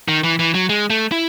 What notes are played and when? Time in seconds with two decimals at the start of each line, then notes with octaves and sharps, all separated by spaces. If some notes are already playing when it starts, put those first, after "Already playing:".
0.08 D#3
0.24 E3
0.39 E3
0.54 F#3
0.69 G#3
0.90 A3
1.12 E4